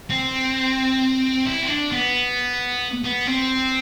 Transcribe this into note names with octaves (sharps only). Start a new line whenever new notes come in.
C4
E4
C4
D4
B3
B3
C4